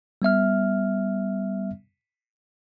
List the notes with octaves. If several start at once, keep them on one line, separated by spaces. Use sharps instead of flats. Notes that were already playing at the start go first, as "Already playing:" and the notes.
G3 B3 E5 F6